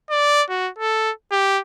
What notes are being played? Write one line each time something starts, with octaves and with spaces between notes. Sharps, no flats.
D5
F#4
A4
G4